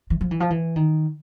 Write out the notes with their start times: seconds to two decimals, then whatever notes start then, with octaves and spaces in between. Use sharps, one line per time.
0.10 E3
0.21 F3
0.31 E3
0.40 F3
0.50 E3
0.76 D#3